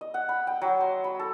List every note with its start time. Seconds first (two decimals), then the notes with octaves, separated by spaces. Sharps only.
0.01 D#5
0.14 F#5
0.29 B5
0.47 G5
0.61 F#3
0.81 C6
1.04 B5
1.19 A4